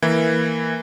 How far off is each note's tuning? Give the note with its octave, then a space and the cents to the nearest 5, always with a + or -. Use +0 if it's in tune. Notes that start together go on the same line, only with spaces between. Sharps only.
E3 -10 A#3 -10 E4 +0